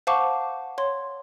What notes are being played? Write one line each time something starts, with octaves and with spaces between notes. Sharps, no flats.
C5 F5 F#5 A5 C#6 D6
C#5 C6